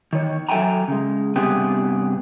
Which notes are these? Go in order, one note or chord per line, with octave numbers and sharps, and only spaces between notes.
D#3 C#5
F#3 A4 E5 G5 G#5 A#5
C#3 G#3
G2 C3 B3 G4 G#4